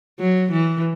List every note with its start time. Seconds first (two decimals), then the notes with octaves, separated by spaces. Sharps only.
0.20 F#3
0.52 E3